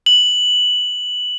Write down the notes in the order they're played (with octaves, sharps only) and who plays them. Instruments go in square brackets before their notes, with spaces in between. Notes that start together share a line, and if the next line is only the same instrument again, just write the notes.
[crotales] F#7